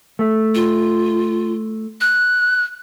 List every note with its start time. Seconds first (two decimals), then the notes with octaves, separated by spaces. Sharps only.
0.19 A3
0.55 F4
2.01 F#6